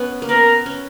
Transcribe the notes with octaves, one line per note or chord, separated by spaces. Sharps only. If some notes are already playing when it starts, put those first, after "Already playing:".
Already playing: B3 C#4
A#3
B3 A#4
C#4